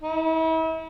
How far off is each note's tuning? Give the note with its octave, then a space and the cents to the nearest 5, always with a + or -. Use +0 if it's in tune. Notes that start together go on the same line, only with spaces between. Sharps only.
E4 -40